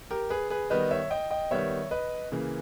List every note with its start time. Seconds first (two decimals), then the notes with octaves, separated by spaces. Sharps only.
0.11 G4 A#4
0.30 G#4 B4
0.50 G#4 B4
0.70 D#3 G3 B3 B4 D#5
0.91 C#5 E5
1.11 D#5 G5
1.31 D#5 G5
1.51 D#3 G3 B3 C#5 E5
1.91 B4 D#5
2.32 C#3 E3 A#3